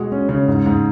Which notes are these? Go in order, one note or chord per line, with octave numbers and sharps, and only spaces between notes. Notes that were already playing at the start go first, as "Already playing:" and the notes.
Already playing: B2 G#3 F#4
C#4
C#3
G#2
G#2